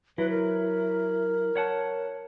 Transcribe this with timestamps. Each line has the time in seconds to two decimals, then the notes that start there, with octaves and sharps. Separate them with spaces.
0.18 F#3 E4 B4
0.30 A#4
1.56 C#5 F#5 A5